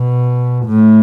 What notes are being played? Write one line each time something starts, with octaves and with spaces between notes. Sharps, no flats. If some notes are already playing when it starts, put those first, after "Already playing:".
Already playing: B2
A2